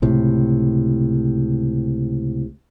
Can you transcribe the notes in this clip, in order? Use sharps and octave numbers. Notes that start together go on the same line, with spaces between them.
C#2 A2 C3